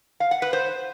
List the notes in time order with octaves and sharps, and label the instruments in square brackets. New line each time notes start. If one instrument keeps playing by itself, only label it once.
[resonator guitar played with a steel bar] F5
F#5
B4
C5